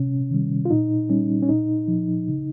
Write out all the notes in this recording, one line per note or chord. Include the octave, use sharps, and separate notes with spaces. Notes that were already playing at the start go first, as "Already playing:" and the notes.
Already playing: C3 C#4
D#3 G3
F4
A#2 D#4
G3 C#4
C#4
A#2 D#4
F3
C#3